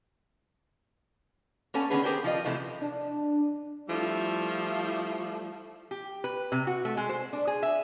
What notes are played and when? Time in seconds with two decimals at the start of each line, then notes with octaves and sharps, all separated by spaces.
1.74 A#3 B3 C#4 A4 G#5
1.90 D3 D#3 B3 C#4 G#4 B4
2.05 G4 G#4 A#4 C5 G5
2.24 F3 F4 D#5
2.45 C3 E3 F3 A3
2.82 D4
3.89 F3 G3 A3 E4
5.91 G4
6.24 B4
6.52 C3
6.67 F#4
6.85 A3
6.97 G#3
7.09 C5
7.33 D4
7.47 G#4
7.63 E5